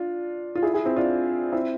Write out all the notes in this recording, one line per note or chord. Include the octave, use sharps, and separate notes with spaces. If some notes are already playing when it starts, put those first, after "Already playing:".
Already playing: D4 F4
F4
E4 G#4
E4 G#4
C4 E4
D4 F4
C4 E4